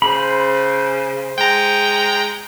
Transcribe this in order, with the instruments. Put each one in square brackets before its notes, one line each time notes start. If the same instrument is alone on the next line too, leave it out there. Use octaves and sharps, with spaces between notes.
[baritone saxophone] C#3 [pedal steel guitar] C5 B5
[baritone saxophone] G#3 [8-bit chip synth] G5 A#5